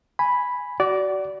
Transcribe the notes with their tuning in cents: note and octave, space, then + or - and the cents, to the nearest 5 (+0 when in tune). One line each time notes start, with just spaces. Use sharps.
G#5 +0 B5 +0
F#4 +25 D5 -15